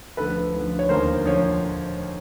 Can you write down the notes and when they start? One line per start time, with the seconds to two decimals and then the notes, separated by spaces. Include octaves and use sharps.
0.17 D2 D3 F3 A4 B4
0.54 D2 D3 F3
0.79 C#5
0.89 F1 D#2 D3 F3 A#4 C5
1.25 D3 F3 C#5